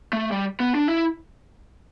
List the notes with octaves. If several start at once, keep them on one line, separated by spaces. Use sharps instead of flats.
A3
G3
B3
D4
E4